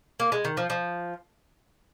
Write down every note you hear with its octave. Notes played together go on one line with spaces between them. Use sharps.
A#3
G#3
D#3
F3
F3